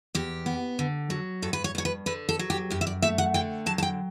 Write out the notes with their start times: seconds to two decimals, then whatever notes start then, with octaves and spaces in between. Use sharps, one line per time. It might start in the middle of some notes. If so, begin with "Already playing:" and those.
0.15 E2 G4
0.46 B3
0.79 D3
1.10 F#3
1.42 G2 A4
1.53 B4
1.64 C#5
1.75 G2 C#5
1.85 B4
2.06 D3 B4
2.29 A4
2.39 F#3
2.50 G4
2.70 F#2 G4
2.81 E5
2.87 D5
3.02 A3 E5
3.18 F#5
3.34 D3 G5
3.66 F#3 A5
3.78 A5
3.83 G5